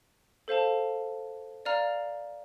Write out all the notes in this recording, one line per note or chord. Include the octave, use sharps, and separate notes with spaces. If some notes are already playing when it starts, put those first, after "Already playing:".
A4 C5 F5 A5
D5 F5 A#5 F6